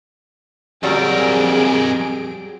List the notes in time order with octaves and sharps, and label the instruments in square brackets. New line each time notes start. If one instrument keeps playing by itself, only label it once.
[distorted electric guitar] F2 A#4 [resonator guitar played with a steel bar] F#3 G3 [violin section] G#4 D7